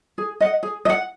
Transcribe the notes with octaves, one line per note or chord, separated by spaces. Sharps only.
G#4
D#5 F#5
G#4
D#5
F#5